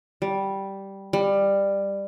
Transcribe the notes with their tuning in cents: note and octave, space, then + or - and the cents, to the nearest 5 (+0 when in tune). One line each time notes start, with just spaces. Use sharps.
G3 -5
G3 +15